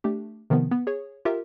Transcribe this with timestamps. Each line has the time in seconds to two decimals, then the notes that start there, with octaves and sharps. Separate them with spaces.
0.04 A3 D4 G4
0.50 C3 D#3 F3 B3
0.71 B3
0.87 G#4 C#5
1.25 F4 G4 A#4 E5